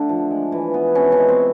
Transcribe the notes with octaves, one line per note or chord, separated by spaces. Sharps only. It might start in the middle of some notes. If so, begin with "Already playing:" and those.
Already playing: D3 A3 D4
F3
G#3
E3
B3
C3 C#4
C#4
G#3
C4